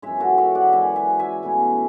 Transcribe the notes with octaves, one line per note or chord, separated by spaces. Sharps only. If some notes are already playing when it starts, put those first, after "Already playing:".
F#2 E3 G#3 C#5 E5
F#4 A4
C#5 E5
D5 F#5
F#2 E3 G#3 E5 G#5
E5 G#5
E5 G#5
B2 A3 C#4 E4